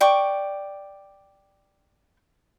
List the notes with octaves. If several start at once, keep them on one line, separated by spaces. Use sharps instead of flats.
D5 G5 C#6